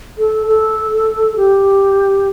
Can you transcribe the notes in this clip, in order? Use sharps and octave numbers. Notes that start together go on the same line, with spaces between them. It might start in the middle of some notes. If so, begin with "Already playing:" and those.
A4
A4
G4